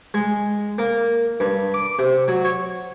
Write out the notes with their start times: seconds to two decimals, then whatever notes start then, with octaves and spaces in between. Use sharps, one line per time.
0.14 G#3
0.78 A#3
1.40 G2
1.74 D6
1.99 C3
2.28 F#3
2.45 C#5